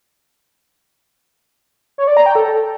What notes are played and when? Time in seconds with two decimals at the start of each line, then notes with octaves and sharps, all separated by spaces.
1.98 C#5
2.07 D5
2.17 A#5
2.26 G5
2.35 A4